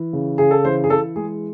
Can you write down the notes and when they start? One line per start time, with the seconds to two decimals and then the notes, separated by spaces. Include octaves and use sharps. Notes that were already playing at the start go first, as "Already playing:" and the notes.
Already playing: E3
0.13 C#3
0.38 C#3 G#4
0.51 A4
0.65 E3 C5
0.84 G#4
0.90 E3 A4
1.16 G#3 G#4